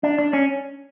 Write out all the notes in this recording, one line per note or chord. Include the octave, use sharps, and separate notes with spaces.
D4
D4
C#4